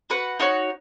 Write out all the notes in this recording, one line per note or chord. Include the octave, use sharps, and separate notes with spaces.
F#4 B4 F#5
D#4 F#4 C#5